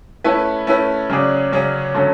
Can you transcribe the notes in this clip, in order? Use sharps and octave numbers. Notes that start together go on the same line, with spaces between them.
A3 C#4 E4 B4
A3 C#4 E4 B4
C#3 F#3 C#4 G#4 D5
C#3 F#3 C#4 G#4 D5
D3 F#3 A3 C#4